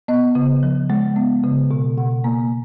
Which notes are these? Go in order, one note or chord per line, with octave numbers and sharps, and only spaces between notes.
B3 D#5
C#3
F3
G#3
B3
C#3
B2
B2 F#5
A#3 A#5